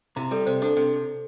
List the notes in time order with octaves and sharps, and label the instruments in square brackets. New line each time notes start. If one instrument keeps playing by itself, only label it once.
[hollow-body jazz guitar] C3 [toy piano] E4
[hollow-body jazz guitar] G3 [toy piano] A4
[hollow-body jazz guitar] C3 [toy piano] C5
[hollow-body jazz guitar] D4 [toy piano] A4
[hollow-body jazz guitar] C3